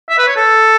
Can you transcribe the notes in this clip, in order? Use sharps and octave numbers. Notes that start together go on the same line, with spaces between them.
E5
B4
C#5
A4